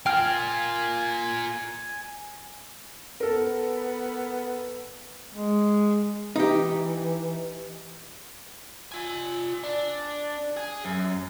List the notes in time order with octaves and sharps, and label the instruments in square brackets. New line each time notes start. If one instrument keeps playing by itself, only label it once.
[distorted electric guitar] F4 A#4 [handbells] G5 F6 [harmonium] G#5
[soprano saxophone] B3 [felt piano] A4 A#4
[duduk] G#3
[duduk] E3 [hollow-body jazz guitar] D#4 G4
[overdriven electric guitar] F4 G#5
D4
G#4
F#2